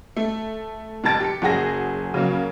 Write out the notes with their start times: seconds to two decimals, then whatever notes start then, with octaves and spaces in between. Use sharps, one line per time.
0.16 A3
1.04 F1 D#2 A5 A6 D7
1.20 G4 C#7
1.42 F#1 F#3 F#4 G#4 A#6
2.14 C#3 F#3 A#3